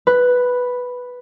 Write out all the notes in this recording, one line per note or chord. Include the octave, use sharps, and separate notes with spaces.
B4